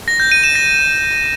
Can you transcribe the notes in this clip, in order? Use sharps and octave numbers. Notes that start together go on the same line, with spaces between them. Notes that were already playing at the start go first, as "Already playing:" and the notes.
A#6
G6
D#7
E7
A#6